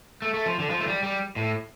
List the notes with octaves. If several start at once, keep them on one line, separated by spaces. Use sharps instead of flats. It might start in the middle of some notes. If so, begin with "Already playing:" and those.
A3
A3
F3
D3
F3
A3
G3
G3
A2